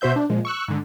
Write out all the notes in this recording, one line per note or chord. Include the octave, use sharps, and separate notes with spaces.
B2 F#4 C5 E5 G6
D4
A#2 F3 G#3
C#6 E6 F#6
G#2 D3